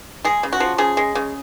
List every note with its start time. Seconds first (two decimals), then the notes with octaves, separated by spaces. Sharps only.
0.24 G#3 G#4
0.43 C#3
0.53 F#4
0.60 F3
0.78 C#3 G#4
0.97 G#3
1.15 C#3